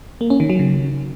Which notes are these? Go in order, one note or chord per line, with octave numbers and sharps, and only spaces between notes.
A#3
C#4
D#3
F#3
C#3